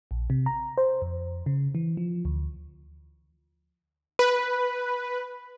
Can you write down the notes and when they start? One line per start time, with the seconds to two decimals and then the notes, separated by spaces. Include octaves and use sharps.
0.11 A#1
0.30 C3
0.46 A#5
0.78 C5
1.02 F2
1.46 C#3
1.75 E3
1.97 F3
2.25 D2
4.19 B4